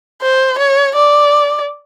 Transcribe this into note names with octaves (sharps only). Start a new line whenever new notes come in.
C5
C#5
D5